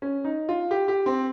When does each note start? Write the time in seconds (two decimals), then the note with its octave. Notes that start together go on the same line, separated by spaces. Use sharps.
0.02 C#4
0.24 D#4
0.49 F4
0.71 G4
0.88 G4
1.06 C4